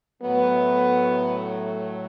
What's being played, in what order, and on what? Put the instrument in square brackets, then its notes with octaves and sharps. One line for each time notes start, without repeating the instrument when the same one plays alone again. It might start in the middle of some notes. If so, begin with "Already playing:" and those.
[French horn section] A2 F#3 A3 B3